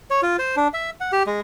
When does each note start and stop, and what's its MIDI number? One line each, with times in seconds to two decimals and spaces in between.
0.11 0.21 73
0.23 0.37 65
0.39 0.55 72
0.56 0.68 62
0.73 0.90 76
1.00 1.11 78
1.12 1.23 67
1.27 1.40 56